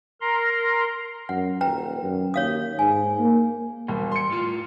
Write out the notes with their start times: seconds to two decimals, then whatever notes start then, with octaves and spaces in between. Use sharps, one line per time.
0.21 A#4 A#5 C6
1.29 F#2 F#5
1.61 D#1 B4 G5 A#5
2.03 F#2
2.34 D#2 C#5 F5 D#6
2.79 G#2 G#5
3.19 A#3
3.88 E1 G3
4.12 C6 C#7
4.30 A2 F4